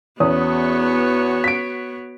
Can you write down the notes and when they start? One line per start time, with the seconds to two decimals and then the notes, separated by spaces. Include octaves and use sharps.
0.20 E2 B3 C#4 F#4 C#5 D#6
1.44 B6 D7